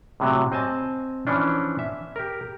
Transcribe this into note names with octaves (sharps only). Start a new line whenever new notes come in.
A2 C3 F#3
C4 D#5 G#5 A5
E3 F3 C#4 D4
E5
G4 A#4